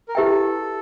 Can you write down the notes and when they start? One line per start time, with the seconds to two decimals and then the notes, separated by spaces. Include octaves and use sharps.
0.08 A#4
0.15 E4 G4 A4 B4 E5 G5